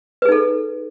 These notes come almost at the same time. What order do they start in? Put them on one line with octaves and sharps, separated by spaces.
B4 G#4 D#4 A4